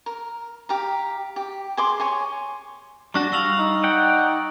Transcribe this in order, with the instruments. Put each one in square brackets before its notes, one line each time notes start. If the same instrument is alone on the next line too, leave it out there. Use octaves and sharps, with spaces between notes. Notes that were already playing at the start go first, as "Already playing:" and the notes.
[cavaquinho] A#4
G4 F5 A#5
G4
G#4 C6 D6
C#5 G#5 C6
[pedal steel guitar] G3 D4 F#4 [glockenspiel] C#6 A6 A#6
[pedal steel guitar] G3 F5 [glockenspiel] C#6 E6 F#7
[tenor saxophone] D#4
[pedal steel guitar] D5 F#5 G5